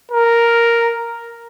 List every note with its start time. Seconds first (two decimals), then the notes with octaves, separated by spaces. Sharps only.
0.11 A#4